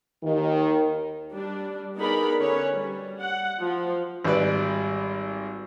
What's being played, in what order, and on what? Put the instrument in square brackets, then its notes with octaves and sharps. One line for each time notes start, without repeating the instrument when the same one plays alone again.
[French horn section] D#2 D#3
[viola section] G3 D4
B3 D#4 G#4 A#4 D5 B5
D3 C#4 B4 C#5
G3
F#5
F3
[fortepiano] G#1 G3 B4 D5